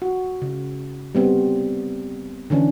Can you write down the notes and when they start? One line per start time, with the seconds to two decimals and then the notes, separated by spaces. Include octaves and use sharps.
0.02 F#4
0.42 C#3
1.15 G3 B3 C4
2.50 D3 E3 C#4 D4